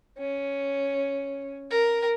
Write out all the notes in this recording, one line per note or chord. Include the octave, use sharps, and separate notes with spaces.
C#4
A#4